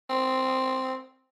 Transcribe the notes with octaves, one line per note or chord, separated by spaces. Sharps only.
C4